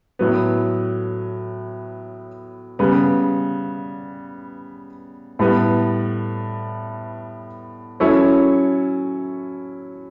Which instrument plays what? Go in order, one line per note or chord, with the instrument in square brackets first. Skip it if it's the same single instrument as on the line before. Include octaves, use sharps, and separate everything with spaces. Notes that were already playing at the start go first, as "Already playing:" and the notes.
[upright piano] A2 F#3 B3
C#3 G3 B3
A2 G3 B3
F#3 C#4 E4 A4 C#5